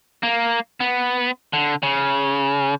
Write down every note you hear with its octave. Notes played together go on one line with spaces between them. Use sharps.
A#3
B3
D3
C#3